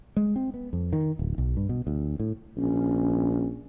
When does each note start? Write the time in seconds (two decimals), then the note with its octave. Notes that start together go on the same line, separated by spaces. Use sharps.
0.17 G#3
0.36 C4
0.54 B3
0.73 F2
0.93 D#3
1.19 D1
1.38 B1
1.57 G2
1.69 B2
1.87 D2
2.20 A2
2.57 A#1 C#4